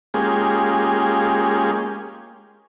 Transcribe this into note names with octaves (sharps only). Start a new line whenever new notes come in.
G#3 A#3 C#4 F4 G4 G#4